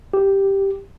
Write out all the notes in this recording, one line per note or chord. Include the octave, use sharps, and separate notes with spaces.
G4